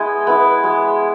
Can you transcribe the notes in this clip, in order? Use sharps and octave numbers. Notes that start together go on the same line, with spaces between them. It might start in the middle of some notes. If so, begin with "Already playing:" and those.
Already playing: G#3 B3 E4 D#5
B3 E4
G#3